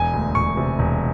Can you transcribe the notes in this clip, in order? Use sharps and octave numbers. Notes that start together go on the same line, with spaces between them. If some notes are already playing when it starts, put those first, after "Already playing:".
Already playing: E1 G#5
D2
E1 C#6
C3
E1